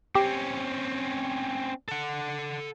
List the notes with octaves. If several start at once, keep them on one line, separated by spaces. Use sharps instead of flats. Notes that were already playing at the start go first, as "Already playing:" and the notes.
C4 C#4 G4
A4 F#5